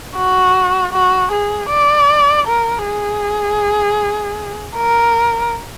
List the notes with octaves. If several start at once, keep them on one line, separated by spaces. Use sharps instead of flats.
F#4
F#4
G#4
D5
A#4
G#4
A#4